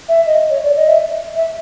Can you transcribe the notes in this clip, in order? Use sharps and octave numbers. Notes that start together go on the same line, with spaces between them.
E5
D#5
C#5
D5
D#5
E5
E5